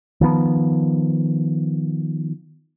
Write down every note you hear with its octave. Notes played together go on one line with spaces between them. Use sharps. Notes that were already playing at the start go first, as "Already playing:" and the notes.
D#3 F3 B3